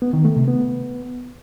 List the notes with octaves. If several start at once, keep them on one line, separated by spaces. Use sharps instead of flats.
B3
D#3
A3
C3
B3